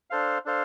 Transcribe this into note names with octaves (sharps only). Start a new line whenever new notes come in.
D4 A4 C5 F5
D4 A4 C5 F5